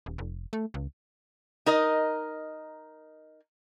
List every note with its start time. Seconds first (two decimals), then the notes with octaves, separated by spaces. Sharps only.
0.06 D#1
0.18 F1
0.53 A3
0.74 C#2
1.66 D#4 A#4 D#5